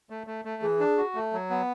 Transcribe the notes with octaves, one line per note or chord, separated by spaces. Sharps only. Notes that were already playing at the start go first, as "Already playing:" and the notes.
A3
A3
A3
E3 G#4
D4
F#4
A3
F#3
B3